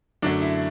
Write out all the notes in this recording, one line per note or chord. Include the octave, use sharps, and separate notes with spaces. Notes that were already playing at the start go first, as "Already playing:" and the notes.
F#2 D3 F#3 A3 D4
E4